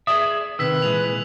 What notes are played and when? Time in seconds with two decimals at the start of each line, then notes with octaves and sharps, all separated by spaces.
0.07 G#4 D5 E5 D#6
0.59 C3 D#3 B4 E6 B6
0.82 A#2 E3 G#3 F7